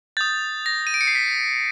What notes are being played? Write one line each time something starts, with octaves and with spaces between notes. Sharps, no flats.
D#6 G6 A6
A#6
D#7
D7
C#7
C7
B6